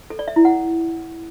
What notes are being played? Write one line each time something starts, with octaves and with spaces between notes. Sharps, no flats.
A4
D5
E5
E4
F#5